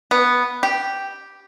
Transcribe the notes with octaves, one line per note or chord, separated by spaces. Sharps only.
B3
G4